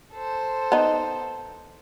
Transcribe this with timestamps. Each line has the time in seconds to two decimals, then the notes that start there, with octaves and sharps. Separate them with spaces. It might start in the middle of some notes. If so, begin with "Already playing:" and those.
0.14 A4 C5
0.72 B3 D#4